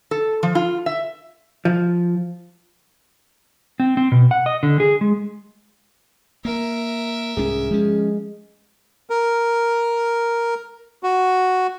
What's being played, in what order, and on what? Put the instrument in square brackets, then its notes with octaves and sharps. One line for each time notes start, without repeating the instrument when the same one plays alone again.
[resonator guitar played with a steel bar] A4
F3
F4
E5
[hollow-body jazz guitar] F3
[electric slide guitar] C4
C4
B2
F#5
D#5
D3
G#4
G#3
[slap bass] A#3 [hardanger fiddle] A#4 E5
[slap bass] C2 G#2 C#4 [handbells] G#4
[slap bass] F3 C#4 [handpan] G#3
[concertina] A#4
F#4